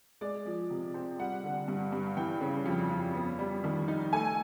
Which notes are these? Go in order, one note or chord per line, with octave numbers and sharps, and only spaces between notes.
G#3 D5
F3
C3
C4
G3 F#5
D3
G2
G2
E3 G5
C#3
F2
F2
B3
G3
D#3
D#4
A3 G#5